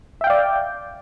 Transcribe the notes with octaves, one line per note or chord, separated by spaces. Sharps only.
D5 E5 F5 G5